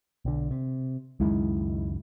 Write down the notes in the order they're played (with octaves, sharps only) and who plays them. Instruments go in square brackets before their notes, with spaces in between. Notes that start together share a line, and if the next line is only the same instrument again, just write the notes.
[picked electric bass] B1 D3
C3
[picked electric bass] C#2 F#2 D#3 [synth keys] G#3 E4